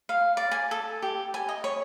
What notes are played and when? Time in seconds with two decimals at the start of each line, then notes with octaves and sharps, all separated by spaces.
0.09 F5
0.37 D5
0.51 G#5
0.71 A4
1.02 G4
1.34 G#5
1.49 D#5
1.64 C#5